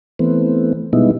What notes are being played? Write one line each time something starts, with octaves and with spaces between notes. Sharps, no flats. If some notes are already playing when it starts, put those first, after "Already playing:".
E3 A3 B3 C4
B2 G3 G#3 B3 D#4 E4